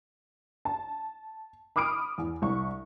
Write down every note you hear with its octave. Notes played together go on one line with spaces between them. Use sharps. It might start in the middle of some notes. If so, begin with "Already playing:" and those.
A5
B5 D6 D#6 F6 D7
E2
C2 C#6